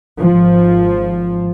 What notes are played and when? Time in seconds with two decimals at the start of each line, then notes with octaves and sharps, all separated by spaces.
0.20 G#1 F3